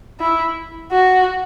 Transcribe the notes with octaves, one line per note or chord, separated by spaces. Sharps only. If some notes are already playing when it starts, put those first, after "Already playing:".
E4
F#4